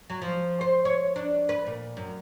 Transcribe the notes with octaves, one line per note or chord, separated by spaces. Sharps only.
F#3
F3
C5
C#5
D4
B4
A#2
F#2